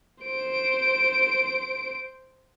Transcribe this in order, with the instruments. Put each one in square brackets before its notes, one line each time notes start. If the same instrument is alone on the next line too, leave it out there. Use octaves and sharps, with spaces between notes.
[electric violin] C5 D7